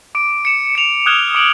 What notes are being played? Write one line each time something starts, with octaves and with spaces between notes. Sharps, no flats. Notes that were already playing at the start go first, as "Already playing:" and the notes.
D6 D7
C#7 E7
C#7 F7
D#6 F6 F#6 G#6 E7 G7
D6 D7 F#7